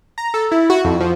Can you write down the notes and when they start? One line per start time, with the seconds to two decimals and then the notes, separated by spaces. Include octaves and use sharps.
0.18 A#5
0.34 A4
0.52 E4
0.70 F#4
0.85 F2
1.00 F3